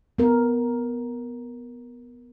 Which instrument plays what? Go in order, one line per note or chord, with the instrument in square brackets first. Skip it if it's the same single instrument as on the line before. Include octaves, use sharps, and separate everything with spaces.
[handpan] B3 A#4